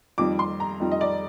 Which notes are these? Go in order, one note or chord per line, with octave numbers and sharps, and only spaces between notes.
F2 D#3 G3 D6
C6
A#5
F2 D#3 G3
D#5
D5